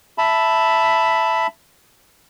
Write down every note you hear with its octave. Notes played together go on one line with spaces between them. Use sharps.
E5 A5 B5